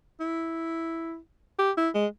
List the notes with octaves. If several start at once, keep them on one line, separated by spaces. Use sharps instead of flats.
E4
G4
E4
G#3